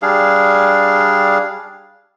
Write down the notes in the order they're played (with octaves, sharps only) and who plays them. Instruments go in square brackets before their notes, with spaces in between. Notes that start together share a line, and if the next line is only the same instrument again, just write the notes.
[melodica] G3 D4 G#4 F5